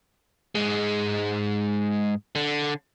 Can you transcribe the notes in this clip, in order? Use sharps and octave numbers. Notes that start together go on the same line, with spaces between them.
G#2 G#3
D3